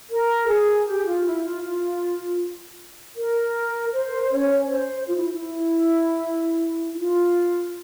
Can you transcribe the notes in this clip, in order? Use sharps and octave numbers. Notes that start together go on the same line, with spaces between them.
A#4
G#4
G4
F4
E4
F4
F4
A#4
C5
A#4
C5
C#4 C#5
C#5
C5
F4
E4
E4
E4
F4